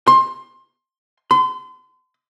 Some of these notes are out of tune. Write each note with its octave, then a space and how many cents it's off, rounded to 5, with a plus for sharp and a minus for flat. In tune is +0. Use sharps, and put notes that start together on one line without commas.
C6 +20
C6 -35